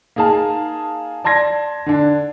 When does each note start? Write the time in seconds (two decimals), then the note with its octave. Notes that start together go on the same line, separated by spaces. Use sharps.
0.16 A#3 D#4 G#4 F5 A5
1.24 D5 A5 C6 G#6 A#6
1.86 D3 D4